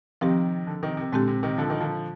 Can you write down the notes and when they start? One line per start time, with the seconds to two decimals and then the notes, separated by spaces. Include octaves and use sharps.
0.21 C3 D#3 F3 C4 G4
0.67 D3
0.83 C3 D#3
0.97 C3
1.13 A#2 D3 G#3 C4 G4
1.28 C3
1.43 C3 D#3
1.58 D3 F3
1.70 D#3
1.80 D3 F3